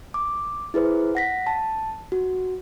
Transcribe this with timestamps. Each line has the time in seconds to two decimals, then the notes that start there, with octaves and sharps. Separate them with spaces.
0.14 D6
0.74 E4 G#4 B4 C5
1.15 F#5 A#6 B6
1.47 A5
2.12 F#4